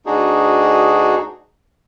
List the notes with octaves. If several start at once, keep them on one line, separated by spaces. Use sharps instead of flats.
D2 D4 D#4 F#4 G#4